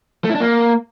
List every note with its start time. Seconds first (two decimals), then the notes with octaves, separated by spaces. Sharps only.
0.24 A3
0.30 E4
0.35 D4
0.40 A#3